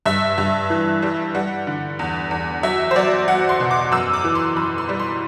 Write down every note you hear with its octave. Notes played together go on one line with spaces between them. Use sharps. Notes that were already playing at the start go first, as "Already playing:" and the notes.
G2 E5
G2
E3
G3
G3 F#5
D3
E2
E2
F#3 E5
C5
F#3 D5
F#3 F#5
C6
B2
D6
F#2 E6
D6
E3
C6
F#2 B5
C6
G3
C6